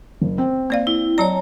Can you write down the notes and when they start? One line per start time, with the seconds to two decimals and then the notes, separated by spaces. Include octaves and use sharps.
0.21 F#1
0.38 C4
0.70 A#3 D5 F5
0.87 E4
1.18 F#3 C#5 D5 A5 A#5